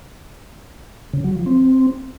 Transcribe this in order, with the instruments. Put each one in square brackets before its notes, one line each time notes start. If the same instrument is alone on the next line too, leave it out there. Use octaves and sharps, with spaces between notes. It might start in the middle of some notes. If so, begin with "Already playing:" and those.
[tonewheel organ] C#3
F#3
F3
C4